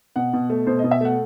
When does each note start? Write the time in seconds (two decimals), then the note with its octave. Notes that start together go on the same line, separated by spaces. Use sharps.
0.16 B2 F#5
0.33 B2
0.50 A3
0.66 B2 C5
0.79 B2 D#5
0.91 E5
1.01 A3 F#5